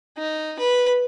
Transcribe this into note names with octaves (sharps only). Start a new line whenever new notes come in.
D#4
B4